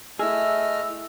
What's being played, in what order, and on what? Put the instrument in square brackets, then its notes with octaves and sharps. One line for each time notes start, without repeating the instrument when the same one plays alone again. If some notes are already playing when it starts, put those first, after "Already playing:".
[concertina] A3 D#5 F6 [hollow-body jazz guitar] E4 G#4 [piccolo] E6